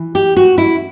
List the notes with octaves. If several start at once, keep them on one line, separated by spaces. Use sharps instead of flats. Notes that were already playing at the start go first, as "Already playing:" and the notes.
Already playing: E3
G4
F#4
E4